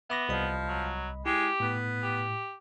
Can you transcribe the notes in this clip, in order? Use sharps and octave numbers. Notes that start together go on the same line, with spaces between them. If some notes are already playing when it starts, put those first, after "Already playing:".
B3 E5 D6 A#6
C2 F3 D#5 B5
F#3
G#3 E4 G4
A2 B3
G4